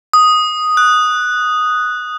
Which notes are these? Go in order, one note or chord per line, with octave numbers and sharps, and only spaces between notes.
D#6
F#6